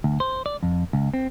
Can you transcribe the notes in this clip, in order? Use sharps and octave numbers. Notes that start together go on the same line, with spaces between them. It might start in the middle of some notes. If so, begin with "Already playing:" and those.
D2
C5
D5
F2
C#2
C4